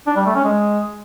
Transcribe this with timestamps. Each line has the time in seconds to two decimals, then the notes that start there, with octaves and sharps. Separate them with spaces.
0.07 D4
0.16 G3
0.26 A3
0.35 C#4
0.45 G#3